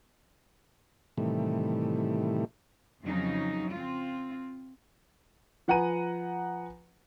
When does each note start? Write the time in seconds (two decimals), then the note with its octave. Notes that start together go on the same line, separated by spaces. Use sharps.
1.18 A2 C3 D#3 E3 G3 A3
3.04 F2 C#3 F#3 D#4
3.73 C4 F4
5.68 F3 B4 F#5 G#5 A#5 D#7